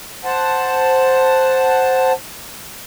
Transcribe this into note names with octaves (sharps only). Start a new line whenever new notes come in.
C5 F#5 A5